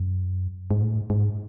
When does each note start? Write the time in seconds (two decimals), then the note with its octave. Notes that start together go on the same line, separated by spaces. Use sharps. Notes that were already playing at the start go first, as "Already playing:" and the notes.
Already playing: F#2
0.71 G#2
0.82 A2
1.10 G#2